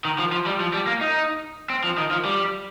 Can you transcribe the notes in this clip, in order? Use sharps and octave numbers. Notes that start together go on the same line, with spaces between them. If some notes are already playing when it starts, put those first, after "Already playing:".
D#3
F3
F3
G3
F3
G3
A#3
D#4
C4
F3
D#3
F3
G3